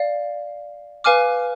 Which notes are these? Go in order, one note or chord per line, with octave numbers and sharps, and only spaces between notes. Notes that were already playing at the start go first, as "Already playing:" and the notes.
Already playing: D5 F5
B4 F5 G#5 D6 F6